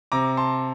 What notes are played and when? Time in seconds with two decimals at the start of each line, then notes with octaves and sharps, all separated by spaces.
0.12 C3 A#5 D6
0.37 A5 C6